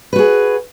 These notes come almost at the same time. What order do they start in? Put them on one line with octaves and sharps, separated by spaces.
B4 F#4 G#4